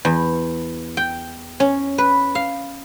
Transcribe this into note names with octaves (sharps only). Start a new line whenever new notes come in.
E2
G5
C#4
B4
F5